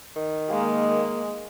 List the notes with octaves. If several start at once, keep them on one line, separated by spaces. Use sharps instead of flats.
D#3
G#3 A#3